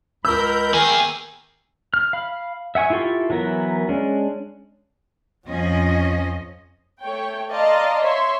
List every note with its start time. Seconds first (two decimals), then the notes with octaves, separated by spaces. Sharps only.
0.25 C#2 A#4 B5 E6 G6
0.73 D#3 B3 G#4
1.94 F6
2.13 F5 B5
2.75 E5 F#5 G#5 C#6 D#6
2.90 E4 F4 G4 A4 C#6
3.30 E3 F#3 B3 A#4
3.89 G#3 C#4 D4
5.48 F2 F3 C#4 D#5
7.00 A3 C#5 G5
7.50 D5 D#5 F5 A5 A#5 C6
8.03 C#5 E5 C6